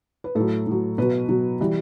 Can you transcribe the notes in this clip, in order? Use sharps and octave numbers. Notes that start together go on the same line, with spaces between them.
B4
A2 F#3 A4
A2 F#3
B2 F#3 B4
B2 F#3
E3 G3